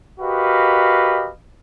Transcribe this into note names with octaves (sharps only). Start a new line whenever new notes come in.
F#4 G4 A#4 B4 D#5 F5